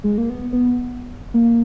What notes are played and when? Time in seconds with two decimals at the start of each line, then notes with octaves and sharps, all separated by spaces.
0.04 G#3
0.18 A#3
0.30 B3
0.53 B3
1.34 A#3